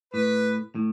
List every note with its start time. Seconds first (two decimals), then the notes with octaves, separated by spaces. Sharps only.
0.14 A2 B4
0.75 A2